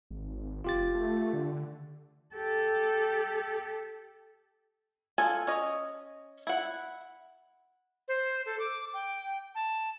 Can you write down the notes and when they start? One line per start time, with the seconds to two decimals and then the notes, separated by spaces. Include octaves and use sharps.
0.11 G#1
0.64 F1 F4 G4 A6
0.95 A3
1.33 D3
2.35 G4 A4
5.18 F3 A4 G#5
5.47 C#4 D#5
6.47 E4 F#5
8.08 C5
8.46 A4
8.60 D6
8.94 G5
9.55 A5